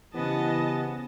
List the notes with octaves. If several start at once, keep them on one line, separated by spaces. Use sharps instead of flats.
C#3 E3 B3 G4 C5 D#5 G#5 A5